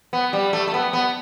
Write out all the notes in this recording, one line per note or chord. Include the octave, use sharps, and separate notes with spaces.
B3
G3
A3
A3
B3
B3